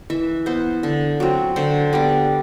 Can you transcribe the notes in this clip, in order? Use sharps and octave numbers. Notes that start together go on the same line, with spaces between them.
E3 E5
B3 C5
D3
F#3 C4
D3 C5
G3 B3 D5